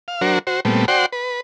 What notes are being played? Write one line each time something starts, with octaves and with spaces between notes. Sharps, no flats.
F5
F#3 D4 F#4 A#4 C5
F#4 C5
A#2 G3 A3 B3 C4
F#4 C5 D5 F#5 G5 C6
B4